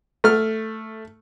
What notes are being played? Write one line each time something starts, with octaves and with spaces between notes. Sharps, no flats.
A3 F6